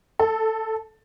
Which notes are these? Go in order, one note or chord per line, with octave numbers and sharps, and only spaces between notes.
A4